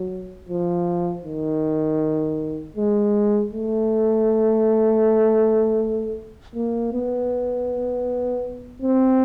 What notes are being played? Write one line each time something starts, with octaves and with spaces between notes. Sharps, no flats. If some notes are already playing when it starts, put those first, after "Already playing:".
Already playing: F#3
F3
D#3
G#3
A3
A#3
B3
C4